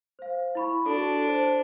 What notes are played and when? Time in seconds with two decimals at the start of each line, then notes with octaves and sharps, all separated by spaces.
0.19 C5 F5
0.55 E4 B5 C#6
0.86 D4 F#4 A4
1.28 C5